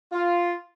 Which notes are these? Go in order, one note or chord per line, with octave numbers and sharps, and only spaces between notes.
F4